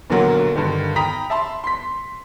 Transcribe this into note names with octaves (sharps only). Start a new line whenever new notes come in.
B1 A#2 D3 F#3 A#4 F#5
G2 D3 D#3
G5 A#5 B5 D#6 B6
E5 A5 B5 C6
C6 B6